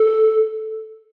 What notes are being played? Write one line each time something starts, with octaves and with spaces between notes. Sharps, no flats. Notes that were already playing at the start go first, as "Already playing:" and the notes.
Already playing: A4